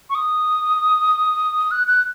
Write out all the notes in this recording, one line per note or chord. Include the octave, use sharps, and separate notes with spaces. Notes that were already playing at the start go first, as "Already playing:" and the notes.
C#6
D#6
F#6
F#6